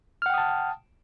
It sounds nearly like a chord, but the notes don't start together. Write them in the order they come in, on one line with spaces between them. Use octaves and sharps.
F6 F#5 G5 D#6 A5